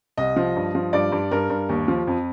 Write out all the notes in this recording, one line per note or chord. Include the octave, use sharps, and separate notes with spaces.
C2 D#5
F3
G2
F3
G2 D5
G2
G2 A#4
G2
D#2
F3
F2